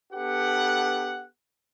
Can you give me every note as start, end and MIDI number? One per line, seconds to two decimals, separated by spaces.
0.13 1.26 59
0.13 1.26 62
0.13 1.26 67
0.13 1.26 69
0.13 1.26 71
0.13 1.26 78